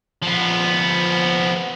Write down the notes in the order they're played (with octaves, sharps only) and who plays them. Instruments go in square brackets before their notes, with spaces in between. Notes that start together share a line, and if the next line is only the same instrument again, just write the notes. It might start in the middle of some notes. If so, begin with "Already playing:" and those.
[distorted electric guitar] F3 B3